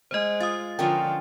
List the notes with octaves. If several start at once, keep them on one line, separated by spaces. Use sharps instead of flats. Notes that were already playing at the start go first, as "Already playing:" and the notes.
G#3 C5 D#5
F4 D#6 A6
D3 F3 C#4 D4 F4 A#4 G5